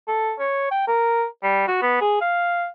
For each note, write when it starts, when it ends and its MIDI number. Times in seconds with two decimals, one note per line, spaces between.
0.08 0.34 69
0.39 0.70 73
0.71 0.83 79
0.87 1.25 70
1.43 1.65 55
1.68 1.78 66
1.82 1.99 59
2.01 2.17 68
2.21 2.67 77